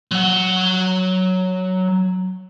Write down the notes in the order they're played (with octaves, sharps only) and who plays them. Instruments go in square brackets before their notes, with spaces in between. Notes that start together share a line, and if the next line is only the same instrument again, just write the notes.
[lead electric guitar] F#3 F#5